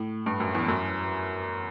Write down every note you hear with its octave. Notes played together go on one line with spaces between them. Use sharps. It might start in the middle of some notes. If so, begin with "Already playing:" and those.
Already playing: A2
G2
F#2
E2
F#2